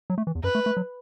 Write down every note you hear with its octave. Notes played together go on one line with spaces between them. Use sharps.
F#3
A3
E3
E2
F#2 B4
A3
A3
F#3